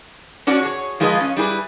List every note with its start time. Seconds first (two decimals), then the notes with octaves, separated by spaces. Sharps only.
0.47 C#4 D4 F#4
0.62 G#4 C#5
1.00 F3 G#3 F4 G#4 B4 D#5
1.20 C#4
1.37 G3 E4 G#4 B4